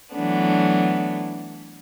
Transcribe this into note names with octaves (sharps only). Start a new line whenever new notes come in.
E3 F#3 A3 B3 D4